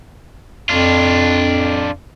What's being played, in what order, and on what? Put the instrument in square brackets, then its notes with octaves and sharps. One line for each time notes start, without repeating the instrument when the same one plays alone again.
[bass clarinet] F2 [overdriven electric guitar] D4 F4